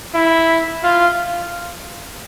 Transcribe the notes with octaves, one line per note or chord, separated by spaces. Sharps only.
E4
F4